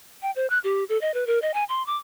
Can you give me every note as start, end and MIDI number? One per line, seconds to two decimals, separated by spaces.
0.22 0.31 79
0.36 0.49 72
0.50 0.59 90
0.64 0.84 67
0.89 1.00 69
1.01 1.14 75
1.14 1.26 71
1.27 1.39 70
1.42 1.52 75
1.54 1.64 80
1.69 1.85 84
1.87 1.97 86